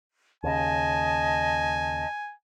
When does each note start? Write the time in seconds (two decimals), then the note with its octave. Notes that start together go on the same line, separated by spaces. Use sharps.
0.44 D#2 C#3 D#5 G#5 A5